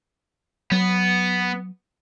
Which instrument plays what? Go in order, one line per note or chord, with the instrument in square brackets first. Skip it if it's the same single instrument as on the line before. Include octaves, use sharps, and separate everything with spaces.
[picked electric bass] F#3 [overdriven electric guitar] B3